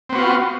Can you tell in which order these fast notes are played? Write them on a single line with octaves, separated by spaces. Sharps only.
C4 B3 F#4 F4